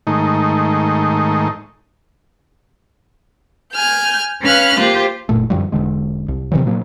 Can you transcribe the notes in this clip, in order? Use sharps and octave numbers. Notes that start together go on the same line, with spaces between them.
G#2 D#3 A3 D#4
G#5 F6 G6
C#4 B4 F5 F6 F#6
A#3 F4 G4 C5
F#1 A#2 A3
F#2 D3 F3 G3
E1 D3 G#3
C2
C3 D#3 E3 F#3
A#2 F3 F#3 A#3